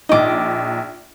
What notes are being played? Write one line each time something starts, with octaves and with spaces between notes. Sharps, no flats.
A#1 D#4 D#5 D6